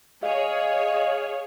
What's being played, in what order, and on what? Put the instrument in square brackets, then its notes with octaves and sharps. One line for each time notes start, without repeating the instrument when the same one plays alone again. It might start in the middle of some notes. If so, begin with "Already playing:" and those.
[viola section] G#4 C#5 [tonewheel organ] D#5 F5